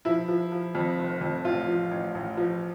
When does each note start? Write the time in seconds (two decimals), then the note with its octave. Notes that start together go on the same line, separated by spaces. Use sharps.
0.05 F3 E4
0.28 F3
0.52 F3
0.75 F2
0.98 F1
1.21 F2
1.45 A1 F4
1.68 F3
1.91 A1
2.15 A1
2.37 F3